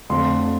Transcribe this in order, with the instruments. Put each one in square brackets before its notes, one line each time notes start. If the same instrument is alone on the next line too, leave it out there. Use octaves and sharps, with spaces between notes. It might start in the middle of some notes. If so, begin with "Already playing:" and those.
[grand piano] F2 D3 F3 A3 C6